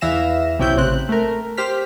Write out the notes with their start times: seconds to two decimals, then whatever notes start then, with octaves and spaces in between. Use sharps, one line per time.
0.01 E2 E3 E5 F5 A#6 E7
0.58 B1 C3 C#4 E4 G5 G6
0.75 A1 C#3 C4 F#6
1.09 A3 A#4
1.57 G4 C5 F6 B6